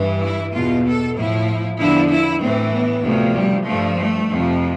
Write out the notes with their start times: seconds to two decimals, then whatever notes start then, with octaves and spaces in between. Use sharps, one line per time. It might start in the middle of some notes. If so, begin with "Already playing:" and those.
Already playing: G2 E3
0.22 E4
0.54 E2 B2 F4
0.86 A4
1.16 A2 F3 E4
1.78 E2 D3 F3 E4
2.11 E4
2.41 A2 E3 C4
2.73 B3
3.04 D2 C3 F3
3.36 G3
3.66 G2 F3 A3
3.98 A3
4.30 F2 C3 F3